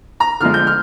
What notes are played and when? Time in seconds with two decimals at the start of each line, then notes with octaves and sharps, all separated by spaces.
0.20 A#5
0.40 D3 F3 G#3 F6
0.54 G6
0.67 F6